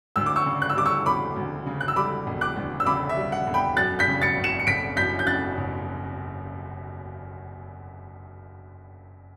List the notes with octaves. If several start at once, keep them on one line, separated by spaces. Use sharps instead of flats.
D2 E6
D6
C#6 E6
C#3
F#6
E6
G3 D6
C#6 E6
E1 B5 D6
D2
C#3
F#6
E6
G3 B5 D6
E1
D6 F#6
D2
E6
C#3 B5 D6
E5
G3
F#5
E1
G5 B5
F#2 F#6 A6
G6 B6
C#3
A6 C#7
F#1
C#7 E7
C#7
F#1 B6 D7
F#2 G6 B6
G6
C#3 F#6 A6
F#1